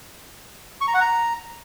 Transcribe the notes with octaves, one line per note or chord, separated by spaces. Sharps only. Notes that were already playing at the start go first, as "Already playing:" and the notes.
C#6
A#5
F#5
A#5